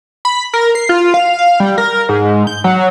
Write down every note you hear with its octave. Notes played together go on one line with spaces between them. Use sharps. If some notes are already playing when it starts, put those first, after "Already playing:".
B5
A#4
C7
F4
F5
F5
G3
A#4
G#2
G6
F#3